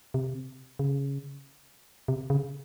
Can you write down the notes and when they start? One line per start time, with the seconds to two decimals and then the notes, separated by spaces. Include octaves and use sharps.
0.14 C3
0.79 C#3
2.08 C3
2.30 C#3